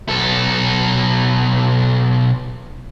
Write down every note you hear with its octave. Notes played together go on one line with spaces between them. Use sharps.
B1 A4